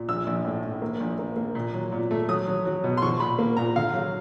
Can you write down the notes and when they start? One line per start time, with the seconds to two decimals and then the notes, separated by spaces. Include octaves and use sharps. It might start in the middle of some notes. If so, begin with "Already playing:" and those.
Already playing: A#2
0.09 A#1 E6
0.27 A#1
0.45 A2
0.63 A2
0.82 A#3
1.00 A#1
1.19 A#3
1.37 A#3
1.55 A#2
1.74 F#3
1.92 A#2
2.11 A3
2.28 F#3 D#6
2.47 F#3
2.65 F#3
2.84 B2
2.97 C6
3.02 F3 C#6
3.20 A#2 B5
3.39 A#3
3.57 A#2 A#5
3.76 D3 F5
3.93 F#3